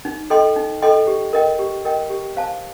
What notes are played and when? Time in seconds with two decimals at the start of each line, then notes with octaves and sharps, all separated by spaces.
0.05 D#4
0.30 A4 D#5 G5 C6
0.56 D#4
0.82 A4 D#5 G5 C6
1.07 G4
1.33 A#4 D#5 G5
1.59 G4
1.85 A#4 D#5 G5
2.10 G4
2.37 C5 F5 A5